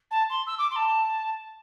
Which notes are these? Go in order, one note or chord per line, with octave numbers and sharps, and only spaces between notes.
A5
C6
E6
D6
C6
A5